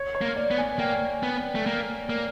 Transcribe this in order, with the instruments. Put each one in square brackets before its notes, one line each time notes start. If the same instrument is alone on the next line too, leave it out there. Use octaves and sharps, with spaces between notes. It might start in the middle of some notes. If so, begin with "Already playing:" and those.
Already playing: [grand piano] C#5
C#5
[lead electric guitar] A#3
[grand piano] D5
[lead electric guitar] B3
[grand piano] G#5
[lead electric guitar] A#3 [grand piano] G5
[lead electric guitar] B3
A3
A#3
A#3